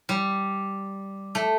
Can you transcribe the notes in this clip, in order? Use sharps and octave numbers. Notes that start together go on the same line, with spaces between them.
G3
A3